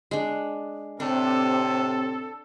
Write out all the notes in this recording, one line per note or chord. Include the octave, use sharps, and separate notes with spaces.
G#3 D4
A2 C3 C4 D4 A4